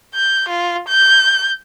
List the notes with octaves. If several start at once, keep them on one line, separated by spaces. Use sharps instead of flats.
G6
F4
G6